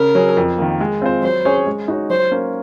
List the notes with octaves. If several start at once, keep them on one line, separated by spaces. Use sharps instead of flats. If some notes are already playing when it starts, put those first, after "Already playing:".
Already playing: C#3 A#4
F#3 C#4 G#4
F2
D#3 A#3
G#3
C4 F4 C5
F#3 C5
C#4 G#4 C#5
G#3
D#4 F#4 C#5
F#3 C5
A#3 C#4